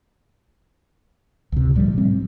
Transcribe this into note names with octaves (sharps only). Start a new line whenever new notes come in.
C#2 C3
A2 F3 G3
G3 C4